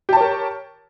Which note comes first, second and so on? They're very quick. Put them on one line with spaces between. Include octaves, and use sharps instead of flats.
G4 A5 C#5 A#4